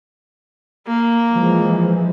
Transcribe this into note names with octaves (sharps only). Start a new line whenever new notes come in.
A#3
E3 F3 G#3